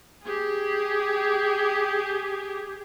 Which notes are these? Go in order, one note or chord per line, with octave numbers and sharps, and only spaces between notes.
G4 G#4